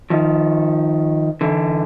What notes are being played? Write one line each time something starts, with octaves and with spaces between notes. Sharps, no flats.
D#3 F3
D3 E3